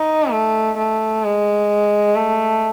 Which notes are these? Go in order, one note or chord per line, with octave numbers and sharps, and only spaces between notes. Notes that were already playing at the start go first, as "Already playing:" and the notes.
Already playing: D#4
A3
A3
G#3
A3